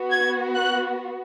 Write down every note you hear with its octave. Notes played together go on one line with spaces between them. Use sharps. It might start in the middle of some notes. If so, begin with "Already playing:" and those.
Already playing: B3 F#4
G#6
F#6